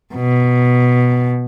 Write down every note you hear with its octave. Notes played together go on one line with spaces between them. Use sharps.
B2